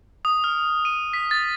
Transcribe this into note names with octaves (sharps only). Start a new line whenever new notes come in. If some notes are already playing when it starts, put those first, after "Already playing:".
D#6
F6
D#7
B6
A6